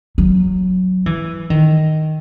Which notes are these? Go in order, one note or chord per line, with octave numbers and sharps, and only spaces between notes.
F#3
E3
D#3